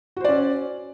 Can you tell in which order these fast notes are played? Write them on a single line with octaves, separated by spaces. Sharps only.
F#4 C5 D5 C#4